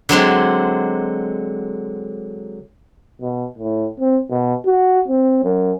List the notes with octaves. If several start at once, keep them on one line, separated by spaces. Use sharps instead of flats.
D3 F#3 G#3 C4
B2
A2
C4
B2
F#4
C4
F#2